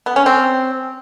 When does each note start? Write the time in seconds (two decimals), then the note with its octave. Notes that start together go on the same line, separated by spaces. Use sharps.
0.06 B3
0.16 C#4
0.26 C4